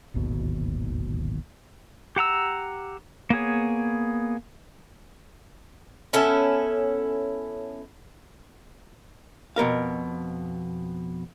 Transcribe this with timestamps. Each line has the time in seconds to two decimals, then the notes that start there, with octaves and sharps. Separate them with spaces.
0.14 D1 G#1 D#2 B2
2.16 G4 F#5 A#5 E6
3.30 A#3 B3 G#4 C#5
6.13 B3 C#4 E4 A4
9.56 F2 B2 A#4 F5